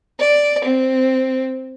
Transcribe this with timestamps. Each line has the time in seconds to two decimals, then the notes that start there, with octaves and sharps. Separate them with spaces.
0.19 D5
0.64 C4